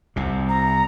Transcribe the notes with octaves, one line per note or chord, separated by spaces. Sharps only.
C2 C3
A#5